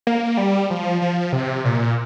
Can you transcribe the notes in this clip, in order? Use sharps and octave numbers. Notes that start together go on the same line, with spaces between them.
A#3
G3
F3
F3
C3
A#2